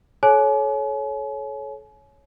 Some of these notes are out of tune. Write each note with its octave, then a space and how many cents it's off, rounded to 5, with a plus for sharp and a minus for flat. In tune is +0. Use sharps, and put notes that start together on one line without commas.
A4 -40 C#5 +0 G#5 +40